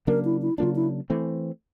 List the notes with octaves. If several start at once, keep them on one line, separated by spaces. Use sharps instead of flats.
C#3 F#3 A#3 D4 A#4
E4
E4
C#3 F#3 A#3 D4 F4
E4
E3 A3 C4